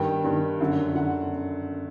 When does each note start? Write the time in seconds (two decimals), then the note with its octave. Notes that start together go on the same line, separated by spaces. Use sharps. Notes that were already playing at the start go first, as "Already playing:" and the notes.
Already playing: G2 D#3 G5
0.24 G2 D#3
0.60 F#2 D3
0.95 D3 F#5